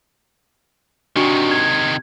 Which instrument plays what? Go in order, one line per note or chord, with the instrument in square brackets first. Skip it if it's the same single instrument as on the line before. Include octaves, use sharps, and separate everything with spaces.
[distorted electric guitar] C3 D#3 [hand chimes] D4 F#4 C#6
[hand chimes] G#6